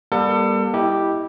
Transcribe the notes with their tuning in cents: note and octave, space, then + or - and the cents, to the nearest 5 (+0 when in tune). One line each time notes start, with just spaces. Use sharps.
G3 +20 A#3 +45 A4 +35
E4 -15 G4 +0 D#5 +0